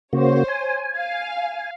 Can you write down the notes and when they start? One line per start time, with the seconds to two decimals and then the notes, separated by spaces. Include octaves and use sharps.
0.13 C#3 A#3 F#4 C5 C#5
0.48 G#5
0.96 F5